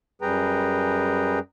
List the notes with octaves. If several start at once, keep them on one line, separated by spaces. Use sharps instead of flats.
F#2 G3 G#4 B4 G5 A#5